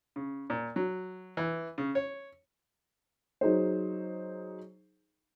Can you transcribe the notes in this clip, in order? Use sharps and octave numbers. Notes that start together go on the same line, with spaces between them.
C#3
A#2
F#3
E3
C#3
C#5
F#3 D#4 G#4 C5